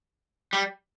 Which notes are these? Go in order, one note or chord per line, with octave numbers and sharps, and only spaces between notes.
G3